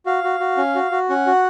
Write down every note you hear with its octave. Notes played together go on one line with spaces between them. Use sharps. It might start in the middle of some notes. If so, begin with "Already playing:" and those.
F#4 F5
F#4
F#4
C#4
F#4
F#4
C#4 F#5
F#4